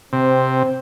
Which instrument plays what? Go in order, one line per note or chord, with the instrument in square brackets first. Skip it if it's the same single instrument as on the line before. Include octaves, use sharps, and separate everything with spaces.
[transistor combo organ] C3 [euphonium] C4